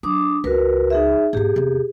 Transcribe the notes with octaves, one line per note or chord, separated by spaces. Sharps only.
F#3 D4 D6 D#6
C#2 F#4 A#4 B4
D#4 G#4 E5
G#2 B3 G4 G#4
E2 C3